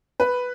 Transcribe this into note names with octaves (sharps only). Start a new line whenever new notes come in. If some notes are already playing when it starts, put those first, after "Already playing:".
B4